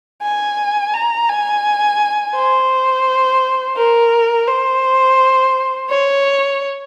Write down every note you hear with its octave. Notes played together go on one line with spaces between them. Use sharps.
G#5
A#5
G#5
C5
A#4
C5
C#5